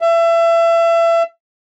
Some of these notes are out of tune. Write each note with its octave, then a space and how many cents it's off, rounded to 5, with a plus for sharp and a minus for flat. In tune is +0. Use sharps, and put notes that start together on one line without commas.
E5 +30